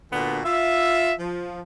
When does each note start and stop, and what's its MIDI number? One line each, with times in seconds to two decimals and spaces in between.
0.12 0.40 46
0.12 0.40 50
0.12 0.40 59
0.12 0.40 62
0.12 0.40 66
0.45 1.11 65
0.45 1.11 76
1.20 1.60 53